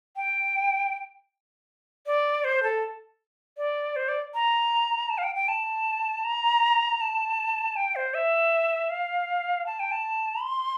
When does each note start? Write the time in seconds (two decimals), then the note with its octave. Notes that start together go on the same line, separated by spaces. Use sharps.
0.16 G5
2.06 D5
2.44 C5
2.63 A4
3.57 D5
3.96 C5
4.08 D5
4.34 A#5
5.10 A5
5.18 F5
5.23 G5
5.35 G5
5.48 A5
6.24 A#5
7.01 A5
7.76 G5
7.96 C5
8.14 E5
8.90 F5
9.66 A5
9.80 G5
9.92 A5
10.42 C6